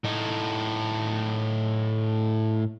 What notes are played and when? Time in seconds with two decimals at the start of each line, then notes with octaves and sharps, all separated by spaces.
0.05 A2 D#4